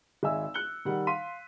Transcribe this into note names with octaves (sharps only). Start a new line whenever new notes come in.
G#1 D#5 E5 G#5 E6
F#6 C#7 G7
D#3 G3 F#5
F5 C6 B6 D#7